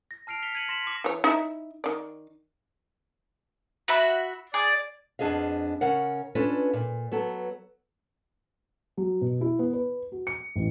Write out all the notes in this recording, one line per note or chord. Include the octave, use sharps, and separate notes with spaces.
A#6
A5 F6 C7 D7 F7
F6 B6 C#7 F7 G7
G#6 C#7 D#7 F#7
C6 A#6 B6 E7 F#7
C6 D6
E3 C#5
D#4 E4 E5
D#3 D5
F#4 E5 B5
G#4 D5
F2 B3 D4 G#4 D#5 F5
C#3 C#4 A#4 F5 F#5
C#4 D4 F4 A4 B4
A#2
F#3 B3 A4
F#3
B2
E4
B3
B4
F#4
C#7
A1